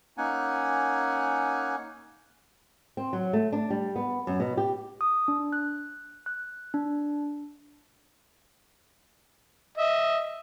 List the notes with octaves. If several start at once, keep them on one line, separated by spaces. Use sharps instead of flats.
A#3 C#4 D#4 F#5 G#5
C4
F#3
A3
D4
G3
B3
F#2
B2
G4
D#6
D4
F#6
F#6
D4
D#5 E5